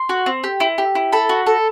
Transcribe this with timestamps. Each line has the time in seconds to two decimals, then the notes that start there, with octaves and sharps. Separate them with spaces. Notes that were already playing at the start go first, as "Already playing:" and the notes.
Already playing: C6
0.09 F#4
0.26 C4
0.44 G4
0.60 E4
0.78 G4
0.95 E4
1.12 A4 B5
1.29 F#4
1.46 A4